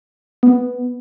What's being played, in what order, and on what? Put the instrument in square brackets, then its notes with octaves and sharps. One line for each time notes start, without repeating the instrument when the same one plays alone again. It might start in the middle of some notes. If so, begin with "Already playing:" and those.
[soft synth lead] B3